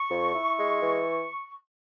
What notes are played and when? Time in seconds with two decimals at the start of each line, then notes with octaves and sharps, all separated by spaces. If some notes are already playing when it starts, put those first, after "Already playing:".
Already playing: C#6
0.11 F2
0.34 E4
0.58 G#3
0.81 E3